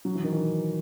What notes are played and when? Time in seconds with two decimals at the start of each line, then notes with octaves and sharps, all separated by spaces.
0.05 F#3
0.15 E3
0.24 D#3
0.32 E3